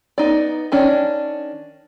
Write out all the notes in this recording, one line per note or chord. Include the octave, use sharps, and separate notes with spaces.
B3 D#4 D5
D#3 C#4 D4